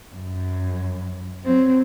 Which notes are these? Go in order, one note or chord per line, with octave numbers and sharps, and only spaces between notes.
F#2
F#3 C4